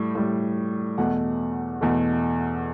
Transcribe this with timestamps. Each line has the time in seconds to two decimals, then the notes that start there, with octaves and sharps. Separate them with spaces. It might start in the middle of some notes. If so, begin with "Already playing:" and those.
Already playing: A2 G3
0.15 A2 G3
0.98 E2 B2 A3 F#5
1.81 E2 B2 A3